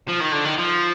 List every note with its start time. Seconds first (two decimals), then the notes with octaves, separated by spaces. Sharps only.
0.09 F3
0.21 D#3
0.32 D3
0.45 D#3
0.58 F3